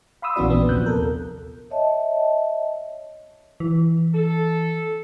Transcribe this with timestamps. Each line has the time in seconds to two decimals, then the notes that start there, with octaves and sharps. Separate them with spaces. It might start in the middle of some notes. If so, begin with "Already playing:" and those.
0.22 F5 B5 C6 D#6 E6
0.36 A#1 E3 B3 C#4 F#4 D5
0.50 A#2 B3 C4 D4
0.69 D#2 C3 F3 F#6 G6
0.86 A4 A#4
1.70 C#5 D#5 E5 A5
3.60 E3
4.14 A4